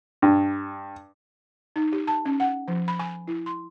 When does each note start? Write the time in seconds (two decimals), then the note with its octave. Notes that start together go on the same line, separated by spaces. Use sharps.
0.22 G2
1.76 D#4
1.93 G4
2.07 A5
2.25 C#4
2.40 F#5
2.68 F3
2.88 B5
2.99 G#5
3.28 E4
3.46 C6